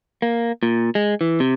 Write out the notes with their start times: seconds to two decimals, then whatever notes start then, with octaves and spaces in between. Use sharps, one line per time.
0.22 A#3
0.63 A#2
0.95 G#3
1.21 E3
1.40 C3